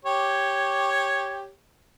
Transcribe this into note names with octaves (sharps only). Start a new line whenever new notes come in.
G4 C#5